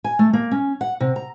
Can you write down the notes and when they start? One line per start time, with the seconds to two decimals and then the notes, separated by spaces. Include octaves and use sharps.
0.04 G#5
0.19 A3
0.33 A#3
0.51 C#4
0.81 F#5
1.00 C3
1.16 A#5